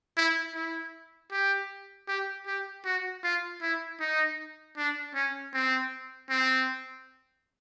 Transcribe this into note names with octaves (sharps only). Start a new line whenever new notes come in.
E4
E4
G4
G4
G4
F#4
F4
E4
D#4
D4
C#4
C4
C4